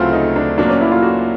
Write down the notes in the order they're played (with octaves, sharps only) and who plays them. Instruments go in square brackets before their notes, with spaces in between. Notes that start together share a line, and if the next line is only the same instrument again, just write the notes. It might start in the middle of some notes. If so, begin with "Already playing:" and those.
Already playing: [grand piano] D2 C#3 F#3 A3 C4 [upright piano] E4 F4
[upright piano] D#4
D4
[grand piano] A#2 F#3 A#3 [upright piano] D4
[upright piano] C#4
E4
F4
F#4